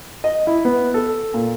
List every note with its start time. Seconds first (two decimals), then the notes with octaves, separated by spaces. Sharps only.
0.24 D#5
0.47 E4
0.65 B3
0.94 A4
1.34 A#2